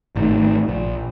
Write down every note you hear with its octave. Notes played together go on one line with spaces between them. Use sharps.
G#1 A2 D#3
A#1